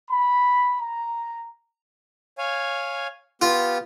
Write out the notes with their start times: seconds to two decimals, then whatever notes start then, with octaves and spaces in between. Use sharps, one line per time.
0.11 B5
0.81 A#5
2.38 C#5 F5 G#5
3.42 B3 F4 G4